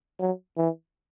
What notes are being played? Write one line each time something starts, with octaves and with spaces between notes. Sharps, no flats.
F#3
E3